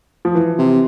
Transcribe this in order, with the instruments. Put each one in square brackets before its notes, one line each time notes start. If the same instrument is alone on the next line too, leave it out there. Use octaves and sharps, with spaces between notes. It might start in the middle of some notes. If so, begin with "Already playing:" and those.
[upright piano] F3
E3
[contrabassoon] C3